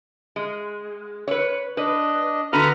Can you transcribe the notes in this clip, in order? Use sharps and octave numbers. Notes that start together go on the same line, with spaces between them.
G#3
B4 C#5
D4 B4 D#5
D3 B3 F#4 B4 A#5 F6